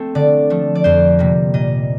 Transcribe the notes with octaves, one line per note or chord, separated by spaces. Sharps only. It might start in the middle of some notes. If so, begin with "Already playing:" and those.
Already playing: A3 C4
D3 D5
F3 A3
D5
F2 C5
C3 G3 A#3
A#2 D#5